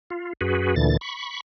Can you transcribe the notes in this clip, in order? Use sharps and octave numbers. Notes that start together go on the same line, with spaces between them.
F4
F#2 F#4 G#4 B4
D2 A#2 D3 E3 A6
B5 C#6